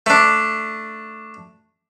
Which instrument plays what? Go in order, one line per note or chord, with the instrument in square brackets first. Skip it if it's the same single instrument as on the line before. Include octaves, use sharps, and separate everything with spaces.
[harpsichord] A3 D4